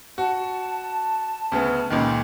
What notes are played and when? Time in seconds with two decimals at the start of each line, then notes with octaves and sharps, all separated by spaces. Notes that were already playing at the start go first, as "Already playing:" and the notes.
0.18 F#4 A5
1.52 D2 C#3 B3
1.90 C#2 A#2 D#3